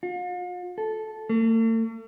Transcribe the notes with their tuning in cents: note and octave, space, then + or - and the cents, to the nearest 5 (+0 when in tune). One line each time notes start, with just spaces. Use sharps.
F4 +45
A4 -10
A3 +45